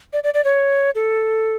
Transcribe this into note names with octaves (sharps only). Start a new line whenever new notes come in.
D5
D5
D5
C#5
A4